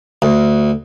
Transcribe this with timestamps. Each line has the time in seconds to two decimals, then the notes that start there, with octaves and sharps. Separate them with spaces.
0.22 D2